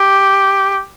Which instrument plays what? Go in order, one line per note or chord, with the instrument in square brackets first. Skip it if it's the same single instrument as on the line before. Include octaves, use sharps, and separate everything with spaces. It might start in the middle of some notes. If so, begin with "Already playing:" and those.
Already playing: [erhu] G4